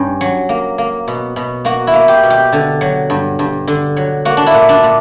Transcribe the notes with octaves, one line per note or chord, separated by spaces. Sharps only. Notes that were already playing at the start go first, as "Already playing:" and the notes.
Already playing: G2 C#4
F#3
A#3
A#3
B2
B2
A#3 F#4
E4
A#3
G4
B2
G4
D3
F#3
G2
G2
D3
F#3
A#3 F#4
D4
E4
A#2
D4
A#2